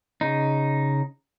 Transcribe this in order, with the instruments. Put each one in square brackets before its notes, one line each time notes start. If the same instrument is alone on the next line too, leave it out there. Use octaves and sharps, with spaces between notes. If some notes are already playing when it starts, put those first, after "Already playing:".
[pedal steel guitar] C#3 D#4